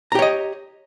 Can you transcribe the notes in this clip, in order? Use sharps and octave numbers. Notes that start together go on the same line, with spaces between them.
G4 C#5 D#5 A#5